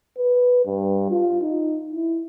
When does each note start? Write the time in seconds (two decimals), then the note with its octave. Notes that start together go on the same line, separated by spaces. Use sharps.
0.18 B4
0.66 G2
1.10 F4
1.42 D#4
1.93 E4